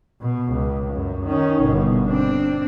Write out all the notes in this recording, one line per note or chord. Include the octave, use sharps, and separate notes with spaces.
B2
C#2
F#2
D#3 C#4
G1 B2
C4 D4